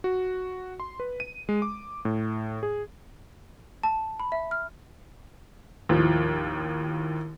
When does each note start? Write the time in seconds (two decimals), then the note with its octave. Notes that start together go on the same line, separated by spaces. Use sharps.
0.04 F#4
0.80 C6
1.00 B4
1.20 D#7
1.49 G#3
1.62 D6
2.05 A2
2.63 G#4
3.83 A5
4.20 B5
4.32 E5
4.51 F6
5.89 D#2 A2 F3